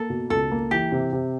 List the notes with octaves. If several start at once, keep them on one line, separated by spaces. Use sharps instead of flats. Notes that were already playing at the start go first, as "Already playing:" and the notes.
Already playing: A#3 A4
B2
C#2 A4
A#3
E3 G4
C3
C3